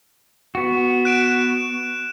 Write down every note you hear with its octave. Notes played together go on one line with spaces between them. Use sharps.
B3 F#4
F#6 D7 E7